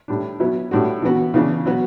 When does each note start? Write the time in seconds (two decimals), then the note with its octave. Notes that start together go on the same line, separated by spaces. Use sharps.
0.08 A2 G3 D4
0.40 B2 F#3 B3 E4
0.71 A2 G3 D4 F#4
1.02 E3 B3 F#4
1.34 C#3 E3 B3 D4
1.66 B2 F#3 B3 F#4